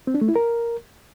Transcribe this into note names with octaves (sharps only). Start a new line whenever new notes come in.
C4
D4
A3
E4
A#4